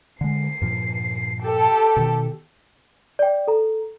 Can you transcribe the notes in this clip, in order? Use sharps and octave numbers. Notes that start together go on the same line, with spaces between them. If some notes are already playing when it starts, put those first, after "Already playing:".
D3 G#3 C7
G2 A#2 F3
G4 A4
B2 D#3
D5 G5
A4 A#5